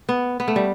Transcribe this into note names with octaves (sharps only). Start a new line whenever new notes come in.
B3
B3
A3
G3